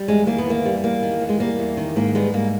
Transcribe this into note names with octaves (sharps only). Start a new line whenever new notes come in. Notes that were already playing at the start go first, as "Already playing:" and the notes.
Already playing: G3
E2 G#3
D#3 A#3
B3
E2 A#3
G3
E2 A#3
D#3
E2
G#3
G3 A#3
E2
D#3
G#2 A#3
G3 G#3 B3
G#2 A#3